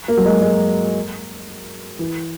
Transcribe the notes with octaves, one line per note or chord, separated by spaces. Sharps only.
A#3
F#3
G#3
G#3
E3